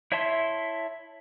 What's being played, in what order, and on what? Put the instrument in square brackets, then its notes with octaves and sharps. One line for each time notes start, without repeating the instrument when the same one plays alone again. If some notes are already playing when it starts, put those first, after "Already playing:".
[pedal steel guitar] E4 C#5 E5 A5 C6